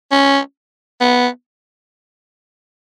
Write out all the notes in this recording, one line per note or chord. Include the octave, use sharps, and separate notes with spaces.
C#4
B3